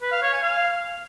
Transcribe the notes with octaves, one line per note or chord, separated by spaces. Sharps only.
B4
F5
C#5
G#5
F5